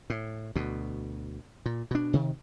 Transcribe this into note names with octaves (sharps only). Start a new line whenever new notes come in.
A2
D2 B2
A#2
B2 D4
C3 D#3